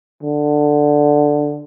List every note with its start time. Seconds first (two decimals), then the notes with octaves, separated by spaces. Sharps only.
0.23 D3